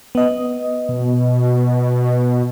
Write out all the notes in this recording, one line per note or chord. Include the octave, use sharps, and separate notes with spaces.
B3 D#5
B2